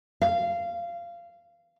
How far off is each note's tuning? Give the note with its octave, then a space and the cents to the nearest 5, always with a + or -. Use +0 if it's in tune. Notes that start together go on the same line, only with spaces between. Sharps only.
F5 -20